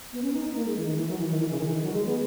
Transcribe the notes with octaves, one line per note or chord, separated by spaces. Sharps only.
B3
C#4
D#4
D#4
A#3
G#3
E3
D#3
E3
F#3
E3
D#3
E3
C#3
D#3
E3
D#3
F#3
G#3
B3